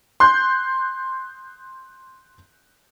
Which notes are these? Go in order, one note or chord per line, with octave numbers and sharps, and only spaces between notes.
C6 F#6 G6